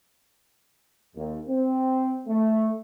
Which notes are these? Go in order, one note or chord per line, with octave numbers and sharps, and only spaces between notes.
D#2
C4
A3